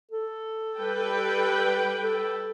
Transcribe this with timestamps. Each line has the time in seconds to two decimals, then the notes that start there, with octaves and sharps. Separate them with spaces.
0.12 A4
0.78 G3 B4 G5
2.03 A4